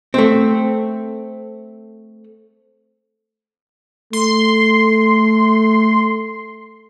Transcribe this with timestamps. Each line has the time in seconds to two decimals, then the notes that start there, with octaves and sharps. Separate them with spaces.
0.14 A3 C4
4.13 A3 C6